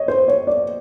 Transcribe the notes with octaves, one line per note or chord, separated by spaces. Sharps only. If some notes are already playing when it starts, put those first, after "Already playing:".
Already playing: C#5 D#5
C5
C#5
D5